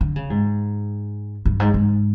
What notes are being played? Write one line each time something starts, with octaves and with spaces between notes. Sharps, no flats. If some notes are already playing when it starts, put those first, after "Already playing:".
D3
C#3
G#2
G2
G#2
G#2